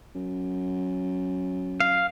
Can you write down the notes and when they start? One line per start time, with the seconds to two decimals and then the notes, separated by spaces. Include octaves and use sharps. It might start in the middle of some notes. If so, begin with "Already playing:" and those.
0.15 F#2
1.80 F5